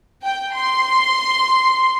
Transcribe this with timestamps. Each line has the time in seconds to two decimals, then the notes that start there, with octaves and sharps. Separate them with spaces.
0.23 G5
0.54 C6